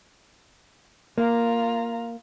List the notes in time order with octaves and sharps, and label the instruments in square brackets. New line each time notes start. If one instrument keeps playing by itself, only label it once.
[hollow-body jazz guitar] A#3 [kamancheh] F4 A#5